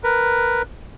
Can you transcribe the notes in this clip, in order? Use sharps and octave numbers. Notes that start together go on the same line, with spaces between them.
A#4 B4